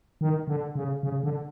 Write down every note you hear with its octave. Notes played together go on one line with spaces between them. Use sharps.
D#3
D3
C#3
C#3
D3